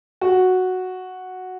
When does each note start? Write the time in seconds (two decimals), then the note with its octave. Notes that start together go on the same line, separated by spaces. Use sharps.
0.21 F#4